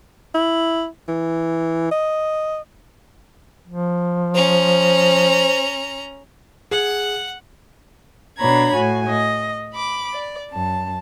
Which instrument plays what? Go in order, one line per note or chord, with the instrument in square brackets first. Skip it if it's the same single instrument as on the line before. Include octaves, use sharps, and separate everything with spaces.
[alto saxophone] E4
E3
D#5
[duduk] F3
[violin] C#4 A#5 [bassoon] C5
[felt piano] G#4 [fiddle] F#5
[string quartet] B2 D4 C#5 A#5 B5 G#6
A2 F#4 G#5
D#5
B5 D6
D5
F#2 A5